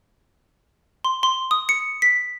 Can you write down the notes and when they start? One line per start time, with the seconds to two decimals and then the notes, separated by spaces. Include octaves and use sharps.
1.05 C6
1.23 C6
1.51 D#6
1.69 C#7
2.02 B6